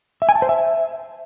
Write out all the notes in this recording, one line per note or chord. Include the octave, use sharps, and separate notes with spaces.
E5
G#5
A5
C5
E5